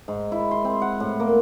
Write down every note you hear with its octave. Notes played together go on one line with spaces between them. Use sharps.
G#2
E4
C6
C4
F#5
A2
A#3